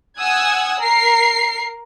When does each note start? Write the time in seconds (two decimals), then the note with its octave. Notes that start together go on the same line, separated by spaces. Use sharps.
0.18 F#5 G#5 D#6 E6 F#6 G#6
0.79 A#4 C7